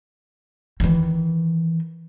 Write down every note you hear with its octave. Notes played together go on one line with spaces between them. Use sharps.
D#3 E3